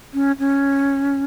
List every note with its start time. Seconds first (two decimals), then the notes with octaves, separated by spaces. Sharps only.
0.14 C#4
0.39 C#4